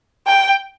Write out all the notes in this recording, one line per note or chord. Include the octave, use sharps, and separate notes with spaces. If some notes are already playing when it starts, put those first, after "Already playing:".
G5